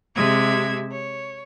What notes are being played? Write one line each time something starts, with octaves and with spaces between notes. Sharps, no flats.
C3 G#3 E5 G#6
C#5